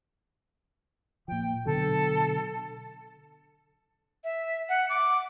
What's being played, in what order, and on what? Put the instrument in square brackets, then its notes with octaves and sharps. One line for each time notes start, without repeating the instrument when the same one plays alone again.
[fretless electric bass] A#2 F3 [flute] G5
[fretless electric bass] B2 D3 F#3 [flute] A4
[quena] E5
F#5
D6